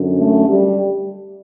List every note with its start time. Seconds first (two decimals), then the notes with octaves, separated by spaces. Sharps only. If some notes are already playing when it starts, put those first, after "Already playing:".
Already playing: F#2 D3
0.18 A3
0.47 G3